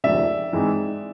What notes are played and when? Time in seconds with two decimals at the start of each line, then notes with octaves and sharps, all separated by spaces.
0.04 F1 D#2 C#3 D5 E5
0.52 G#2 E3 G#3 C4 D#4